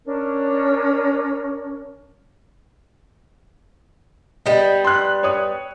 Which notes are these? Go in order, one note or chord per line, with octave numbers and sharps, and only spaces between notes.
C#4 D4 A#4
G3 B3 D#5
C6 F#6
C#5 D#6